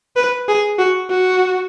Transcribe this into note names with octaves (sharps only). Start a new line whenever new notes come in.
B4
G#4
F#4
F#4